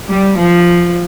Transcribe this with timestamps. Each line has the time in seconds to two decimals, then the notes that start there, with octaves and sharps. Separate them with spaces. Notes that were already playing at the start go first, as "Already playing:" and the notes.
0.09 G3
0.38 F3